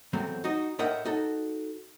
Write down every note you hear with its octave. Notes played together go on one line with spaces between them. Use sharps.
E2 F#3 A3 C4
D#4 F#4 D#5
A2 A#4 D#5 E5 F#5 G5
D#4 F#4 A4